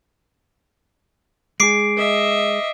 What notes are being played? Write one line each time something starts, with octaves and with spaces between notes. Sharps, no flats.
G#3 G#4 D6 C7 D7
D#5 E5